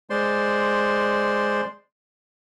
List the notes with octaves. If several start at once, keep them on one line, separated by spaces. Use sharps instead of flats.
G#3 C5 D5 C6